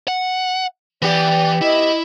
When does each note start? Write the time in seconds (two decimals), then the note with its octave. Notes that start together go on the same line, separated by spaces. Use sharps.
0.08 F#5
1.02 E3 B3 G4 D5
1.61 E4 D#5